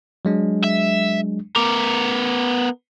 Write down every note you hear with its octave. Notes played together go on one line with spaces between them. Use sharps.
F#3 G#3 D4
E5
B3 A#4 D6